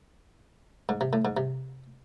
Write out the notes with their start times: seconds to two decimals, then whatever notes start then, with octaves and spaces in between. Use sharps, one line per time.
0.89 G#2
1.01 C3
1.13 A2
1.25 G#2
1.37 C3